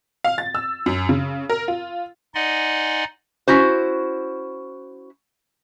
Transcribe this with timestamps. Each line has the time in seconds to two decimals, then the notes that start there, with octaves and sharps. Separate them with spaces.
0.24 F5
0.38 A6
0.55 E6
0.86 F#2
1.09 C#3
1.50 A#4
1.68 F4
2.35 D#4 D5 D#5 F#5 G#5 C6
3.48 C#4 E4 F#4 C5